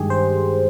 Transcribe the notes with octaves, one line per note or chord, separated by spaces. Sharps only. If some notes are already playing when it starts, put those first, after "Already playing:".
Already playing: G2 D#3 G#3 G4 G#4
C5